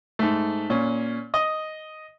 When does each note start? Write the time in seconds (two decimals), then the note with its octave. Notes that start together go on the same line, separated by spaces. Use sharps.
0.19 G#2 A3
0.70 A#2 C#4
1.34 D#5